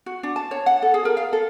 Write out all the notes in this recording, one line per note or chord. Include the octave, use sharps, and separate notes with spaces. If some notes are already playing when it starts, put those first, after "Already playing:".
F#4
D4
A5
C#5
F#5
A4
G#4
A#4
F5
A4